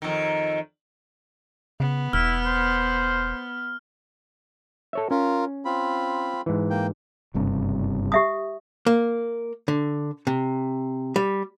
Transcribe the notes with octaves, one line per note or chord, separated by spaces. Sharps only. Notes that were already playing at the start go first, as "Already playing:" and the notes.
F2 D#3
C#3 B3
E1 E4 F6
C5
A4 C#5 E5
C#4 F4 A#4
C4 F4 B5
G#2 E3
A#3 G5
F#1 G2 C3
G4 E5 D#6
A#3
D3
C3
G3